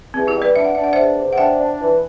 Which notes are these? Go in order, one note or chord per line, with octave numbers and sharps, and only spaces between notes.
E2 C4
E4 G4
G3
B4 D5
D4 E5
F#5
D4 E5
F#5
E2 C5 E5
C3
F#5
D4 E5 G5
D4
E3